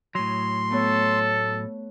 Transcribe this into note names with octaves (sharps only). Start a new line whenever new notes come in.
A2 F#3 C6
A3 B3 A4 C#5